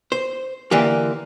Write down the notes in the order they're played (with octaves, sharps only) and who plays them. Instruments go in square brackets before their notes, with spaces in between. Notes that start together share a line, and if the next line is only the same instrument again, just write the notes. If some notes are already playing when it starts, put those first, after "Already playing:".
[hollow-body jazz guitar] C5
D3 E3 A#3 G4